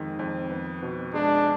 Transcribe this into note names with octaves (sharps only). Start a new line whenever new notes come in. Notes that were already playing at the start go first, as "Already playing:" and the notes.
Already playing: F2 D#3 G#3
F2
B3
B2
G#3 D4